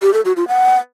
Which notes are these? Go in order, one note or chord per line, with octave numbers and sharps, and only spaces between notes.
G4
A4
F#4
F4
F#5